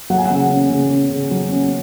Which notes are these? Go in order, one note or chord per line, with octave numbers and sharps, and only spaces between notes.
F#3 F#5
G#5
F#5
C#3
C#4
C#3
C#4
C#3
F#3
C#4